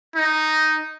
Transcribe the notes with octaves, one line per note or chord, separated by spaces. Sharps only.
D#4